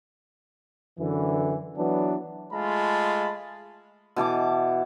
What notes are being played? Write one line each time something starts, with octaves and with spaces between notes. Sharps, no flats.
F#2 D3 E3
E3 F#3 B3 D4
G#3 A3 F4 A5 B5
B2 E3 A5 D6